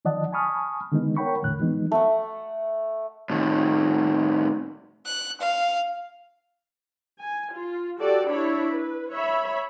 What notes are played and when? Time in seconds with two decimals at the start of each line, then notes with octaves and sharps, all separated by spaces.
0.05 D#3 F3 D5 D#5 F#5 A5
0.32 G#5 A5 B5 C#6 D#6 F6
0.92 D3 D#3 G#3 B3 D#4
1.17 A#4 C#5 F#5 G5 B5 C#6
1.42 E2 A2 D3 F#6
1.59 E3 F3 G#3 B3 D#4
1.92 A3 F#5
3.30 A2 D#3
5.05 F#6
5.41 F5
7.20 G#5
7.52 F4
7.99 F#4 G4 A4 D5
8.29 D4 E4 C#5 B5
8.73 B4
9.11 C#5 E5 B5